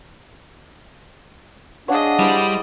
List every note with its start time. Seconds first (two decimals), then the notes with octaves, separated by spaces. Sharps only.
1.88 D4 G#4 C#5 D#5 F5 F#5
2.19 G3 E4 C5